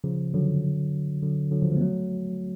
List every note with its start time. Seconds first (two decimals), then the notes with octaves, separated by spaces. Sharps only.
0.04 C#3 F3
0.34 D3 F#3
1.23 D3 F#3
1.51 D3 F#3
1.62 C#3 F3
1.72 F3 G#3
1.76 B3
1.81 F#3 A3